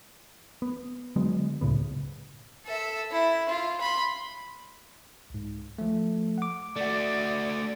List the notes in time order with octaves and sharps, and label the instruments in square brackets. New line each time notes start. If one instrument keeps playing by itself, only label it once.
[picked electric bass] B3
D3 F#3 G#3 B3
C#2 A2 C#3 B3
[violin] A4 E5
E4
F4
B5 C6
[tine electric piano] C2 G#2
F3 A3
F#5 D6
[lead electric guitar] A3 F#4 [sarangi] D5